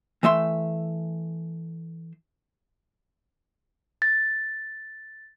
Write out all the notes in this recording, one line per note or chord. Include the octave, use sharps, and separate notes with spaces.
E3 A3 E5 C6
A6